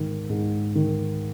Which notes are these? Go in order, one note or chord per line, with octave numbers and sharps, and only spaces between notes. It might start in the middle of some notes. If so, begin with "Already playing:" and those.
Already playing: G#2 D#3
G#2
D#3